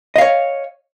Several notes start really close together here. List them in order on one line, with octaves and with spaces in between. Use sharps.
D#5 F5 C#5